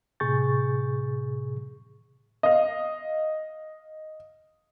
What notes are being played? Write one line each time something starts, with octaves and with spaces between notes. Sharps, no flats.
A2 C3 G#4 C#6 G6 A6
D#5 F5